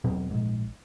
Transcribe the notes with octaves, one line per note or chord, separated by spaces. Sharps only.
E1 B2 F#3 C4
A#1 G#2